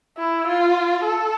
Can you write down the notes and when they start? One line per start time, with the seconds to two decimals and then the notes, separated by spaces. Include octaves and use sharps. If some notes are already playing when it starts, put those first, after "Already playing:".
0.18 E4
0.47 F4
1.05 A4